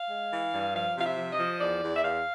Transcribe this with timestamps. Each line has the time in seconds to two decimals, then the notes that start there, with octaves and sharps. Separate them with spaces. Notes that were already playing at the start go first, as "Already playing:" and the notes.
Already playing: F5
0.10 G#3
0.31 E3
0.52 G2
0.74 F3 F5
0.96 C3 F5
1.03 E5
1.17 F3
1.32 D#5
1.39 F3
1.60 E2 D5
1.82 E2
1.95 E5
2.04 E2 F5